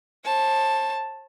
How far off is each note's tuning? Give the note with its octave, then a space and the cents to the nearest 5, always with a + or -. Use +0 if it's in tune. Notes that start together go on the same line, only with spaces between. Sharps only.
C5 +45 A5 +0